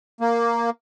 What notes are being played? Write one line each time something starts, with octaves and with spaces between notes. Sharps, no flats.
A#3